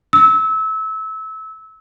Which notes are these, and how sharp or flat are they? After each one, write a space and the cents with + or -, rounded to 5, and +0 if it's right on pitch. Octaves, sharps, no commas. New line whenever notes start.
E6 -25